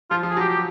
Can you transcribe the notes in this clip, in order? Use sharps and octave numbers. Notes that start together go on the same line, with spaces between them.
F3 F4
F3
G#4
F#3 G4
G4